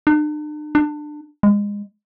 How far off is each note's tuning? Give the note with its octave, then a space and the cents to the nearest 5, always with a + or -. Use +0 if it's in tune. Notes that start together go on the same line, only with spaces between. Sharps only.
D4 +45
D4 +25
G#3 -25